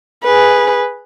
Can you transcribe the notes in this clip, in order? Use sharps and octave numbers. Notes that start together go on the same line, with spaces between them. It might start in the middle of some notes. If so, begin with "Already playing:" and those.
G#4 B4